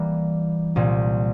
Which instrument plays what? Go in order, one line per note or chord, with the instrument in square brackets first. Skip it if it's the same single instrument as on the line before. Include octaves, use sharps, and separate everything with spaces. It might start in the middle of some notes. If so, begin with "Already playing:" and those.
Already playing: [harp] E3 G3 A#3
C2 A#2 G3